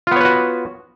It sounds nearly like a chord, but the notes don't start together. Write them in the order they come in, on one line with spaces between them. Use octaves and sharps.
F4 B3 C#5 B4 F#4